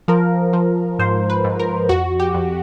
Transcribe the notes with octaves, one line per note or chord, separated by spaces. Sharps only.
F3 A#4
F3
G#2 C5
B4
G#2
A#4
F2 F#4
G4
F2